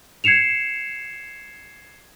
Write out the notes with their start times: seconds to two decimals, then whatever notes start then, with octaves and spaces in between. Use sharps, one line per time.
0.24 G#6 C7 C#7 E7 F7